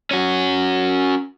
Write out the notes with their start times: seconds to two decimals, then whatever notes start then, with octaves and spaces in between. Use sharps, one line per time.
0.11 C#4 F#4